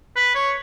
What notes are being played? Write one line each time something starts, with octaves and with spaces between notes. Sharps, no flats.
B4
C#5